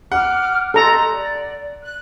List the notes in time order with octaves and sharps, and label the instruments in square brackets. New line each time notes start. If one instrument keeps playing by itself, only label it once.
[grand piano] F#5 [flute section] D6 F6
[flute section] G4 D#5 C6 [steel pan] A4 A#5
[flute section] D5
F#6